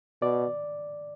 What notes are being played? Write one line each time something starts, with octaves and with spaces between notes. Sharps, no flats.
B2 D5